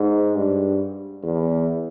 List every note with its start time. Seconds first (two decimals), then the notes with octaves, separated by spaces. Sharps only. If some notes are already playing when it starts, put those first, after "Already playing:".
Already playing: G#2
0.36 G2
1.23 E2